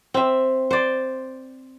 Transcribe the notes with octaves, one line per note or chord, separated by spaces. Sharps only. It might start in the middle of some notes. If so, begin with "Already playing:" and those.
C4 E5
C5 D5